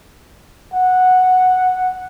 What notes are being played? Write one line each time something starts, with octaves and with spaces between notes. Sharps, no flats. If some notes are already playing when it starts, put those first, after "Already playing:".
F#5